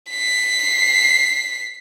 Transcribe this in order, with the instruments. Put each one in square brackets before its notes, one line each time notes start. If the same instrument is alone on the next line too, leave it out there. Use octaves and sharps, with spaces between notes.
[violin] B6 C7